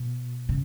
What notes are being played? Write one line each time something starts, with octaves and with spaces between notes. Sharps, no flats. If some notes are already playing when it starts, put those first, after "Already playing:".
Already playing: B2
C#3